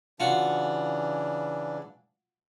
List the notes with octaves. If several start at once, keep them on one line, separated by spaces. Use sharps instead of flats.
C#3 E3 D4 F4 F#4